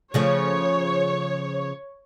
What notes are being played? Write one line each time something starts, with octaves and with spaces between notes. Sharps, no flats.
C#3 F3 A3 C#5